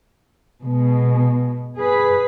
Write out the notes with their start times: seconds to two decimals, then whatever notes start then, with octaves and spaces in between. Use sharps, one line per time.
0.63 B2 G#3
1.76 G#4 B4